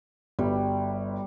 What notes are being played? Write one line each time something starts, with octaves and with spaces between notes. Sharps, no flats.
G1 G3